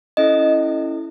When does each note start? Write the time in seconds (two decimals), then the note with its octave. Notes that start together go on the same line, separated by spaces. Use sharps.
0.17 C#4 E4 A4 D#5